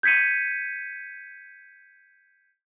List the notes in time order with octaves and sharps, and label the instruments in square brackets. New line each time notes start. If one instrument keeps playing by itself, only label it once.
[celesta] G6 G#6 B6 C#7 D#7